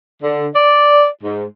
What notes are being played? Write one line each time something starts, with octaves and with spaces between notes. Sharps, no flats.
D3
D5
G#2